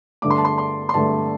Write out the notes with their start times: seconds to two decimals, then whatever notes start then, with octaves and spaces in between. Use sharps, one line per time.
0.22 G2 D3 A3 D6
0.30 C6
0.37 A5
0.45 C6
0.58 C6
0.89 C6
0.94 G2 D3 A3 A5